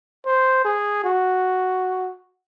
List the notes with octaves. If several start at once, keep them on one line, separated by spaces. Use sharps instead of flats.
C5
G#4
F#4